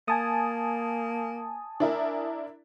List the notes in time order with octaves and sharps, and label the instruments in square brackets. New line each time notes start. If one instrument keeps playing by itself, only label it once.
[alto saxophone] A#3 [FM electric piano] G#5 A5 D#6
[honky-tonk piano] D4 E4 A#4